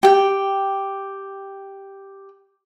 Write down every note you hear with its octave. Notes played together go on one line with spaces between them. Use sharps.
G4 G5